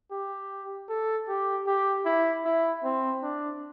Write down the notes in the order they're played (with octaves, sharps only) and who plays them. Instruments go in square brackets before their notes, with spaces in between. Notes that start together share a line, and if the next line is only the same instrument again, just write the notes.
[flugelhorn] G4
A4
G4
G4
E4
E4
C4
D4